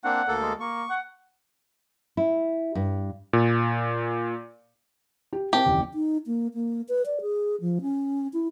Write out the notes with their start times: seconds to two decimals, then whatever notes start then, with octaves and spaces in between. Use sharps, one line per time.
0.04 A#3 C4 D4 F#5
0.28 D2 A#3 A4
0.42 G#3
0.60 A#3 C#6
0.90 F#5
2.17 E4
2.75 G2
3.33 A#2
5.33 G4
5.53 C4 G4 A#4 A5
5.66 F#1 D#2 E3
5.94 D#4
6.27 A#3
6.54 A#3
6.89 B4
7.06 D5
7.21 G#4
7.61 F3
7.82 C#4
8.33 E4